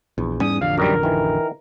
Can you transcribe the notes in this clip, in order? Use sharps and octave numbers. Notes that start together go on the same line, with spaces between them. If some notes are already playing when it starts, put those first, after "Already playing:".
A#1 E2
G#2 G3 C#4 D#6
A1 F2 D3 F5
F#2 D#3 G3 A#4
D#3 E3